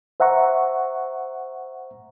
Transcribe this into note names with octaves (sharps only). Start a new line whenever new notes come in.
C5 E5 F#5 A#5 C#6